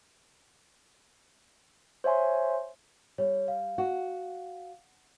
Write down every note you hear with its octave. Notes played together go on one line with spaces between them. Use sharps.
C5 C#5 E5 G#5 C6
G3 C#5
F5
F#4